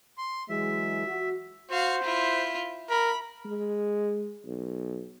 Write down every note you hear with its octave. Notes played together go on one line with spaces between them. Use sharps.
C6
E3 F#3 G#3 E5
F#4
F#4 C5 F5
E4 F4
A#4 B5
G#3
B1